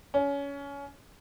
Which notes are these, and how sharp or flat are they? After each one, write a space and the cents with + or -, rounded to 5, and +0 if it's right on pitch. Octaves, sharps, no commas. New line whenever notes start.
C#4 +25